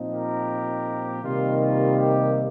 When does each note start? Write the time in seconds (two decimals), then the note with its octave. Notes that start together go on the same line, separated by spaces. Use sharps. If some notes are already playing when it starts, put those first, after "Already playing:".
Already playing: A#2 F3 C4 D#4
0.12 G4 A#4
1.22 C3 D#3 G3 A#3 D#4 F4
1.59 F4
1.95 G4